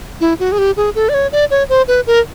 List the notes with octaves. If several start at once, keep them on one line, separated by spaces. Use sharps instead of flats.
E4
F#4
G#4
G4
G#4
A4
D5
C#5
D5
C#5
C5
B4
A#4